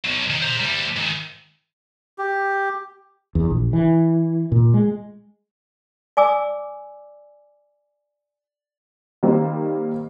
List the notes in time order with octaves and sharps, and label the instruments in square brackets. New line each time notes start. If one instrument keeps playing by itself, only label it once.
[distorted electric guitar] B2 F#3
D#3
C5 A#5
D2 G3
G#2 D#3
[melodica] G4
[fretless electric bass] E2
A#1
E3
A#2
G#3
[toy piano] D5 G#5 D6 E6
[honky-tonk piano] D#3 G3 A#3 C4 D#4